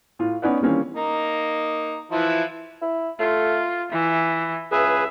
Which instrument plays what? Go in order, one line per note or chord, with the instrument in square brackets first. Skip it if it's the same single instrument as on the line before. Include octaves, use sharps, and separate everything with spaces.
[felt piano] A2 F4
B3 C#4 D#4 B4 D5 F#5
D#3 E3 G3 A#3 C4 C#4
[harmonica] A#3 D#4
E3 F3 E4
[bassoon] E4
[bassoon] A3 [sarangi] F4
[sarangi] E3 [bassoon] E4
[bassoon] C#2 [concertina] G#4 B4 [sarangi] E5